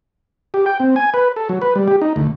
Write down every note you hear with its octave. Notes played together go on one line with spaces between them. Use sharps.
G4
G5
C4
G#5
B4
A4
F#3
B4
G3
G4
D#4
D2